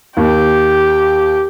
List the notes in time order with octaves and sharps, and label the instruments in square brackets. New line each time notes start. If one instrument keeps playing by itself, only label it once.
[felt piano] D#2 [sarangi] G4